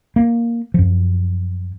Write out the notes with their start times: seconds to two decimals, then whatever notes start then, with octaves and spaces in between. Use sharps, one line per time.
0.16 A#3
0.74 F#2 F3